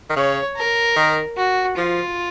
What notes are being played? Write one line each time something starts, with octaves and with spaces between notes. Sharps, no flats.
D#3
C#3 C#5
A#4
D#3
F#4
F3 F4